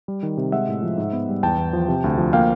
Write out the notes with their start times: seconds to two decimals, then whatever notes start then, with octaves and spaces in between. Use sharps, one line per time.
0.08 G3
0.23 D#3
0.37 C3
0.52 G#3 E5 F#5
0.68 A2
0.83 F3
0.98 G#2
1.13 B3
1.28 G3
1.43 E2 G5 A5
1.58 E2
1.73 F3
1.88 C3
2.04 D2
2.18 F3
2.33 A#3 F5 G5